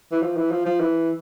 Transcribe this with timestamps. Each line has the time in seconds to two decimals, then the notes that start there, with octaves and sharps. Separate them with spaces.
0.12 E3
0.23 F3
0.37 E3
0.52 F3
0.66 F3
0.80 E3